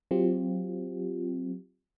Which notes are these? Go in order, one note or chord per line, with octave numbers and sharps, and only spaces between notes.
F#3 C4 F4 G4